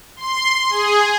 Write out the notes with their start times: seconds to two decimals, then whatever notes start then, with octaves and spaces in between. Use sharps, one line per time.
0.16 C6
0.70 G#4